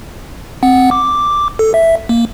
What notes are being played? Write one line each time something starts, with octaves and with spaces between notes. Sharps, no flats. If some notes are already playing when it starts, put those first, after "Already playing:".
C4 F#5
D6
A4
E5
A#3